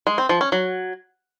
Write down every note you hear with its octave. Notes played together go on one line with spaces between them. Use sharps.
G#3
C4
F3
C#4
F#3